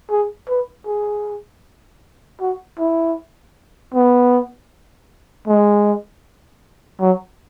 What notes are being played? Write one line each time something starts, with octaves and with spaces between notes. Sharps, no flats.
G#4
B4
G#4
F#4
E4
B3
G#3
F#3